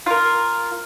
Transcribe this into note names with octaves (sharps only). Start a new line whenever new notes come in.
F4 A#4